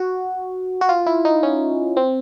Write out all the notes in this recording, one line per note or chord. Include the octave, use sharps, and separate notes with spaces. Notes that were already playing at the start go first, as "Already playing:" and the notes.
Already playing: F#4
F#4
F4
E4
D#4
C#4
C4